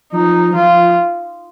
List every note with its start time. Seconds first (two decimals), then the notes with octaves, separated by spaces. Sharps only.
0.13 F3 D#4
0.54 F3 F4